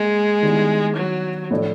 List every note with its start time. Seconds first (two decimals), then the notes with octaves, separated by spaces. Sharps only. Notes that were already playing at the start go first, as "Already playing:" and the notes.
Already playing: G#3 A#3
0.43 D#3 G3 B3 E4
0.97 F#3
1.51 A2 F3 A3 D4